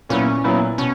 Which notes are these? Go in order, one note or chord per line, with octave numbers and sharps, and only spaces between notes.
A#2 F#3 B3 C#4 E4
A#2 F#3 B3 E4
B2 C#4